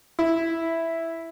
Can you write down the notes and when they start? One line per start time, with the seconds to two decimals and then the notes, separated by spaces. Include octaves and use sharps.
0.19 E4